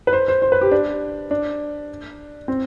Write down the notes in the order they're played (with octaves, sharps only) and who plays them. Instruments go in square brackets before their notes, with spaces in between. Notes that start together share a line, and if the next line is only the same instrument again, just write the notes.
[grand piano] B4
C5
C5
C5
B4
G4
D4
D4
C4